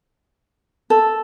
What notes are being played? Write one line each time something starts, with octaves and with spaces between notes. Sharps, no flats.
A4